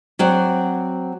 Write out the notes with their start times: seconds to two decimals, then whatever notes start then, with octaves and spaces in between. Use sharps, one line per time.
0.19 F#3 C4 D5 F#5